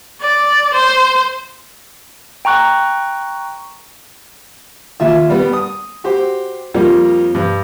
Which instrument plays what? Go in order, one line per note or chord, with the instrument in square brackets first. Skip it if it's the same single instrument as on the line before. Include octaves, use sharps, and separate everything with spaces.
[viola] D5
C5
[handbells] G5 A#5 C#6 F#6
[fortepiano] D#2 F4 E5
G3 B3
D#6
F#4 G4 C5
F2 F3 G3 A#3
G2